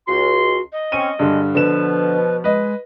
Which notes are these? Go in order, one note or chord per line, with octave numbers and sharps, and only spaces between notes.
C#2 F#4 C6
D#5
C4 C#4 C#6 D#7
G2 D3 G#3
B2 D3 F3 B4 E7
G#3 B4 D#5